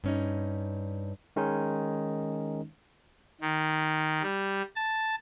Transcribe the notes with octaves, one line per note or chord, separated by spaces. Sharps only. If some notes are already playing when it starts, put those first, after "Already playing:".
G2 C#4 D#4
D#3 G#3 C#4 D#4
D#3
G3
A5